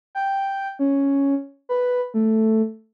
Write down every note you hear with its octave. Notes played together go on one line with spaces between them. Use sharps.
G5
C#4
B4
A3